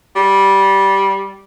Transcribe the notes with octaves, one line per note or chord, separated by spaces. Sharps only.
G3